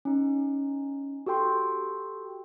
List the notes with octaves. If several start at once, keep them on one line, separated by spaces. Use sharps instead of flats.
C#4 D#4
F#4 G4 A4 G5 C6